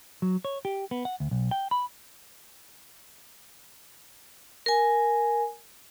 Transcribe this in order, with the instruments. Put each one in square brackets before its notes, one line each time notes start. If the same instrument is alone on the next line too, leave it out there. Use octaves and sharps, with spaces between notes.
[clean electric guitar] F#3
C#5
G4
B3
F#5
D2
B1
G5
B5
[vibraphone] A#4 G#5